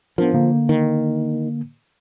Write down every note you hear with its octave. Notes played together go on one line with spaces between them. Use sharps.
F3 B3 D4 A#4
D3 A#3
D#3